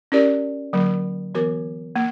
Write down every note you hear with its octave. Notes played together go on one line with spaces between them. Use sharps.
C#4 E4 G4 A#4 D5
D3 F#3 A#3
E3 B3 F#4 A#4
A#3